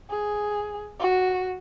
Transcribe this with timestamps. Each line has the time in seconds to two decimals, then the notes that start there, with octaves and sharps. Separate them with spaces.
0.10 G#4
1.00 F#4